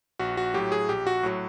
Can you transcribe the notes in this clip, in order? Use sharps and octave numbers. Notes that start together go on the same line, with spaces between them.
A#1 F#4
F#4
A2 F#3 G4
G#4
A#1 G4
F#4
A2 F#3